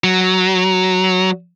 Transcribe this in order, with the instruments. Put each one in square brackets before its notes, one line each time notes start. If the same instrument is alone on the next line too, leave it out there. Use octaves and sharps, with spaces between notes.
[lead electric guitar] F#3